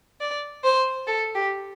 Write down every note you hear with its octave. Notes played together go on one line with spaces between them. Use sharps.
D5
C5
A4
G4